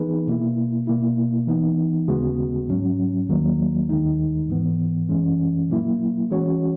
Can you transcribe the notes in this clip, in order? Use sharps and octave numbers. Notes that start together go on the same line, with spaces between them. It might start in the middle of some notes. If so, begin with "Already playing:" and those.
Already playing: E3 B3 D#4 G#4 B4
B2 A#3 E4
B2 A#3 E4
E3 B3 D#4
D#2 C#3 G#3 B3 F#4
G#2 F#3 C#4
D#2 D#3 F#3 A#3
D#2 D#3 G#3 D#4
G#2 E3 B3
F#2 E3 G#3 C#4
A#2 F#3 A#3 E4
E3 G#3 C#4 F#4 C#5